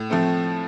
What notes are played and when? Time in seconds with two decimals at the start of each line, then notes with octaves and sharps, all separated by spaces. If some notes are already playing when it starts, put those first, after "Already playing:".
Already playing: A2
0.10 F3 A3 C4